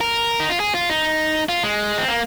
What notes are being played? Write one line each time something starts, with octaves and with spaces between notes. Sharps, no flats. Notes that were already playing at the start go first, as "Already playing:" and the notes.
A#4
D#4
F4
G#4
F4
D#4
F4
G#3
C4
A#3